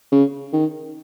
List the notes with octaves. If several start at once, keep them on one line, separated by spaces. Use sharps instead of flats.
C#3
D#3